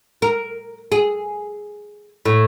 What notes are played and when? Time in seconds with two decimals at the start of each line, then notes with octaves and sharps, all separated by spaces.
0.22 A#4
0.92 G#4
2.25 A2